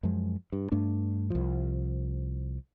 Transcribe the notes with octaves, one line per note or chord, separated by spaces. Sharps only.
F#2 F3 G#3
G2
G2 A3 D4
C2 F3